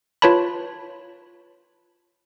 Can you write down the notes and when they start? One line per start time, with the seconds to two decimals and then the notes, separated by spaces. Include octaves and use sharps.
0.22 F4 B4 C#5 A5 B5